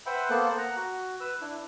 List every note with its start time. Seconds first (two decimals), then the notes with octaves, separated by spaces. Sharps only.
0.06 B4 C5 E5 F#5 G5 B5
0.30 A#3 B3 A4 C5 F#6
0.58 F#5 A#5
0.76 F#4
1.20 B4 E6
1.41 D4 E4